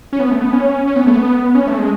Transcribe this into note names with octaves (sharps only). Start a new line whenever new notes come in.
C#4
B3
A3
B3
C#4
C#4
B3
A3
B3
C#4
A3
G#3